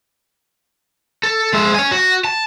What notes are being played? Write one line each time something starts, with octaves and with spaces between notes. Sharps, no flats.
A4
G#3 E5
C#5 G#5
F#4
A5